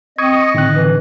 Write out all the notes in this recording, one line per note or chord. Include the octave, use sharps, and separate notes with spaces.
C4 D#5 C#6 D#6 G#6
A2 D3 D#3 C4 F#6
E3